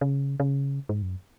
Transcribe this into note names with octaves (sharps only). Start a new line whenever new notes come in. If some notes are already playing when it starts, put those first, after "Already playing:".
C#3
C#3
G#2
F#2